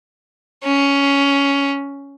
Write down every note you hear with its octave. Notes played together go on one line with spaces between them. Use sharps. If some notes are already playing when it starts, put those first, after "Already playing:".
C#4